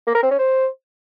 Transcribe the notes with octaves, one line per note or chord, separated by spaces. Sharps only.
A#3
A#4
C4
C#4
C5